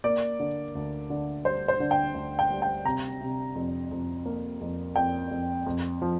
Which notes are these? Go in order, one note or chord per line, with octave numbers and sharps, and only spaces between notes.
A#3 D5
D3
D2
D3
G3 C5
C5
D3
G5
D2
G5
G3
G5
C3 A#5
C3
F2
F2
A#3
F2
F2 G5
F2
F2
F3